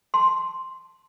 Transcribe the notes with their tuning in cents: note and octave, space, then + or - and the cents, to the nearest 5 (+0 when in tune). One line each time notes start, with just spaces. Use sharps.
A5 +0 C6 +0